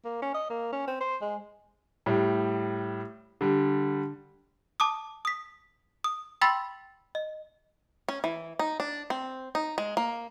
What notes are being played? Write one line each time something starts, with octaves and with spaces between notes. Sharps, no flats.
A#3
C#4
D#5
A#3
C#4
C4
C5
G#3
A2 G3
D3 G3
A5 D6 D#6
D#6 B6
D#6
G5 B5 C6 E6 A6 B6
D#5
C#4
E3
D#4
D4
C4
D#4
G#3
A#3